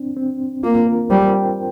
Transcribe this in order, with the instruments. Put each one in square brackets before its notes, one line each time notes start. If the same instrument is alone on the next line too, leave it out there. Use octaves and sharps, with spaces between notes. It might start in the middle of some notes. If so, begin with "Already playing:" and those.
Already playing: [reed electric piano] C4 D4
C4
[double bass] A#3 [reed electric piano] F4
[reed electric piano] A#4
[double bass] G3 [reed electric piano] C5
[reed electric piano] G5